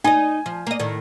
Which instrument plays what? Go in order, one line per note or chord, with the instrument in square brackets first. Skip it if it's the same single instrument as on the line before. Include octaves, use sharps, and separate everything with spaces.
[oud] D#4 D#5 [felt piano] G#5
[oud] F3
A#3 D#5
A2 D#3